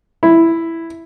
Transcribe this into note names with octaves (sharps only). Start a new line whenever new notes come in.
E4